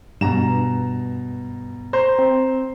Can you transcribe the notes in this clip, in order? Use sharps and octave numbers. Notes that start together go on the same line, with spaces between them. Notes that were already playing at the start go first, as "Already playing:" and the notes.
G2 B2 A#5 E7
C5 A#5 C6
C4